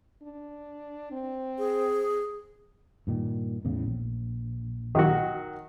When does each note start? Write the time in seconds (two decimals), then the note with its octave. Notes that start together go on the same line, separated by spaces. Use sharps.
0.23 D4
1.12 C4
1.58 G#4
3.07 G2 A#2 D#3
3.65 E2 A2 C#3
3.86 A#1
4.95 D#3 F#3 F#4